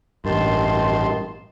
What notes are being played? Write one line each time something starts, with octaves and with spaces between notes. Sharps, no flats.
A1 G2 D#3 A5 C6